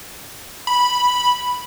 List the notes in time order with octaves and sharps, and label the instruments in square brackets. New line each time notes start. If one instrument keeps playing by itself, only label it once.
[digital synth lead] B5